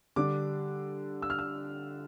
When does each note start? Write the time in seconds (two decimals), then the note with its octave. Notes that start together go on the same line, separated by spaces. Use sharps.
0.16 D3 G3 D4 D6
1.22 E6
1.30 F6
1.39 E6